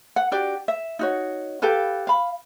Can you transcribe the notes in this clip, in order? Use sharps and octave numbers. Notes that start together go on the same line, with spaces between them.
F#5
D4 F#4 G4 D5
E5
D#4 F#4 C#5
G4 A4 B4 F5
F5 B5